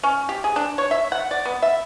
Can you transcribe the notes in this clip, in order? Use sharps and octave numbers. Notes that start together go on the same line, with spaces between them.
C#4
G4
G#4
D4
C#5
E5
F#5
D5
B3
E5